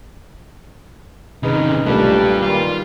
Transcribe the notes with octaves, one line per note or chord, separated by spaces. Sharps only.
C3 D#3 C#4 D#4 G#4 B4
B1 A#2 G3 A3 D4 G4 B4
D#3 F4